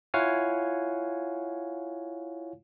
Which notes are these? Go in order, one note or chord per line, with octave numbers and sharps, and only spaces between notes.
E4 F4 C#5 F5 F#5 G#5